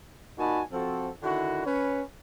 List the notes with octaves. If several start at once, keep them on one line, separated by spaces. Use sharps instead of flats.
A#2 D#4 F#4 G#5 A5 B5
F3 C4 F#4 A4
D3 D#3 E4 F#4
C#4 B4 C#5